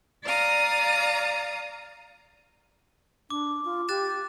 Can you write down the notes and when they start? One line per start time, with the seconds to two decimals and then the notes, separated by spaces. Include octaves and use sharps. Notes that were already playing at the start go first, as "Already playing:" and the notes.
0.24 D5 F5 A#5 D#6
3.30 D4 D6
3.65 F4
3.89 G4 F#6 A6 E7